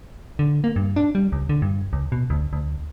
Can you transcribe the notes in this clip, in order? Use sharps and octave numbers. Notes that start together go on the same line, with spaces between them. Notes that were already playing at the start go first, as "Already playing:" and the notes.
D3
A#3
G2
D4
G3
C#2
D3
G2
C#2
B2
D2
D2